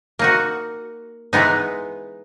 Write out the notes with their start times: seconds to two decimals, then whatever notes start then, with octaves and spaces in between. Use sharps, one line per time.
0.19 A#3 D#4 F#4
1.33 E3 G#3 B3 D#4